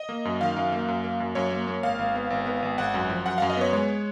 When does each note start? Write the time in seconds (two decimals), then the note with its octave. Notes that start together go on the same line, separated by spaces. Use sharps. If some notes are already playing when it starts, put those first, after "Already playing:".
Already playing: D#5
0.09 A#3
0.25 F#2
0.41 D#3 F5
0.56 F#2
0.72 A#3
0.88 F#2
1.04 A#3
1.20 F#2
1.35 F#2 C#5
1.52 A#3
1.67 A#3
1.83 G#1 F5
1.99 G#1
2.15 B3
2.30 G#1
2.46 B3
2.63 G#1
2.78 G#1 F#5
2.94 F#2
3.10 F3
3.26 F#2 F#5
3.38 F#2 F5
3.50 D#5
3.57 B3 C#5
3.73 G#3 C#5